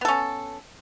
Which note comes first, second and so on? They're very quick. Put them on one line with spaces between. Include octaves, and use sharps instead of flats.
B3 A4 C#4